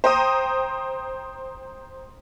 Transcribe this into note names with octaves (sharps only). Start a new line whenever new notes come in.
C5 G5 A#5 C6 D#6